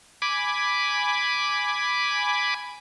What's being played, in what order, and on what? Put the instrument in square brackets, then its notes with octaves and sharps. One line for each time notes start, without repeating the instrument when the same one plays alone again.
[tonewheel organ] G#5 B5 D6